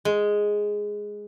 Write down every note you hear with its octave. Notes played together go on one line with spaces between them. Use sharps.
G#3